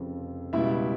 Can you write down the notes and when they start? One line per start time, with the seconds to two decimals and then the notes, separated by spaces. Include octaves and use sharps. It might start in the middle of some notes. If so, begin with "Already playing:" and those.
Already playing: F1 F2 C#3 F3
0.53 C#2 B2 G3 E4 E5